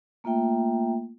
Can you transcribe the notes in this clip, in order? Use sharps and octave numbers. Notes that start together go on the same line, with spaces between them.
A3 A#3 F4 E5 G5